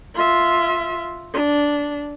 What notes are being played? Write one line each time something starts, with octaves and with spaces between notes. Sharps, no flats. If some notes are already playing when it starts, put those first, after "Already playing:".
F4 E5
D4